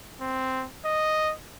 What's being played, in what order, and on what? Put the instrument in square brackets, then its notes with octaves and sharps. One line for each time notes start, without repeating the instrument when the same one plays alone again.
[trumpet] C4
D#5